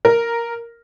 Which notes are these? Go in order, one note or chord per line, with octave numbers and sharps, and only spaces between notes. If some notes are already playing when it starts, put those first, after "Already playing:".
A#4